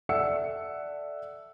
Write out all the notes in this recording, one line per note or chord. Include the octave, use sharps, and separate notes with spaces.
A4 D5 E5 F#5 E6 C#7